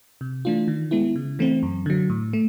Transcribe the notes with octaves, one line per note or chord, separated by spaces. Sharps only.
C3
E3 A3 D4 F4
D#3
G#3 B3 E4
C#3
E3 A3 C4
F#2
D3 F#3
A2
A3